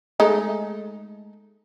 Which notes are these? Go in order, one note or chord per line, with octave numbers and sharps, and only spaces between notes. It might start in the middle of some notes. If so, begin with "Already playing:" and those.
G#3 A3 D#4